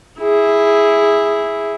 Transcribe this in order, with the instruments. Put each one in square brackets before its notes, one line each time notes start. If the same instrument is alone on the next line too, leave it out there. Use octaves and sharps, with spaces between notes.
[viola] E4 G#4